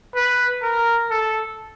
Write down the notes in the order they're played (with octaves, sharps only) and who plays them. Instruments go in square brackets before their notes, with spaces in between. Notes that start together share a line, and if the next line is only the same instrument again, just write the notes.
[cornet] B4
A#4
A4